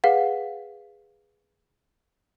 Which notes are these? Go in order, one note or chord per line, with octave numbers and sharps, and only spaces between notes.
G#4 B4 F5 F#5